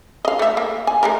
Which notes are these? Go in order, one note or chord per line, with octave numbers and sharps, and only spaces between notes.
D#5 F5
A3 E5
A#3
G#5
G#3 A3 A#4